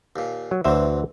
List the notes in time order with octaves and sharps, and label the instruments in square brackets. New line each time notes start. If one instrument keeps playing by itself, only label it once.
[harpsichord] D#2 A#2
[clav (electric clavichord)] F#3
[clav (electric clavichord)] D2 C5 E5 [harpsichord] E3 F#3